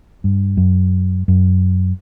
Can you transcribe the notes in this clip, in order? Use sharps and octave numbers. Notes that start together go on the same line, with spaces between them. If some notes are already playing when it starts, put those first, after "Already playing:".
G2
F#2
F#2